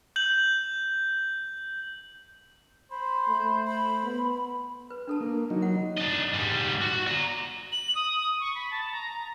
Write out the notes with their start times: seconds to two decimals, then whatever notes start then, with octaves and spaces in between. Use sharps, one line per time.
0.16 G6 F#7
2.91 C5 B5
3.28 A3
3.67 B5
4.04 B3
4.90 B4
5.07 D4 A4 A5
5.20 A#3
5.50 F#3 D#4
5.62 F4 F#5
5.98 D4 D#5
6.34 G#2 G3
6.81 F#4
7.07 D5 A#5
7.72 F#7
7.95 D#6
8.40 C#6
8.55 B5
8.71 A5
8.92 A#5